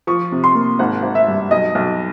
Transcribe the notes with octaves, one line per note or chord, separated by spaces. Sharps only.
F3 C#6
C3
C6
A#3
G#1 F#5
G#1
E5
G2
B1 D#5
B1